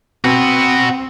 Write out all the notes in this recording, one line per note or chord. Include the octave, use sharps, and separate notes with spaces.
C4 F#4 B4